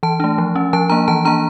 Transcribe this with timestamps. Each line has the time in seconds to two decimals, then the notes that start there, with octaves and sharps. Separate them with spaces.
0.03 E3 A5
0.20 A3 D4
0.38 F3
0.56 C#4
0.73 F3 A5
0.89 A#3 D4 A#5
1.08 E3 A5
1.25 A#3 D4 A#5